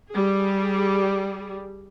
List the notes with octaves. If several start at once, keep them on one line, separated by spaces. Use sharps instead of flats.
G3 G#4